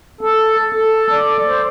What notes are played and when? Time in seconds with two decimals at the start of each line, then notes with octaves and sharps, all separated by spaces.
0.21 A4
0.73 A4
1.11 D5
1.47 C5